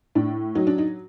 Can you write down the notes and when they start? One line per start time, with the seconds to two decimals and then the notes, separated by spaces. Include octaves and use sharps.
0.15 A2 D4
0.55 F#3 D#4
0.67 D4
0.78 D#4